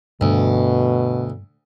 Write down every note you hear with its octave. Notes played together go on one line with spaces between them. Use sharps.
D2 G2 B2